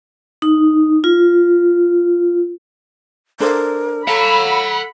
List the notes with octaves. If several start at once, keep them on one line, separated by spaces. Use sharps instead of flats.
D#4
F4
D4 A4 A#4 C5
A4 F5 F#5 A#5 B5